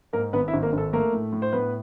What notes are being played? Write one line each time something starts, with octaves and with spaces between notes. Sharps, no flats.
G#2 A#3 A#4
G#1 B3 B4
E4 E5
G#1
A#3 A#4
G#1 A4
A3 A#3 A#4
A2
A2
C5
A2 B3 B4